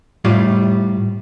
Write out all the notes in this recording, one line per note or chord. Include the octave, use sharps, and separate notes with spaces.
A2 G3 F4